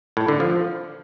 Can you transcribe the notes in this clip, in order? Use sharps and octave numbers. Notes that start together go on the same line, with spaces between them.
A2
D3
F3